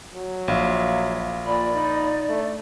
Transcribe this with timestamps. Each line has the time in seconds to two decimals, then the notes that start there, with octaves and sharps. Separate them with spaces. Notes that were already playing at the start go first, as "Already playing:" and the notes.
0.14 F#3
0.48 A#1 E5 F5
1.46 A#2 D5 B5
1.75 D#4
2.29 A3 D4